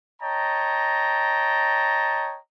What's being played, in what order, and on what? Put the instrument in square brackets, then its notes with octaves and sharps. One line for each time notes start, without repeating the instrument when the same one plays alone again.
[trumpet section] C#5 D#5 G5 A5 A#5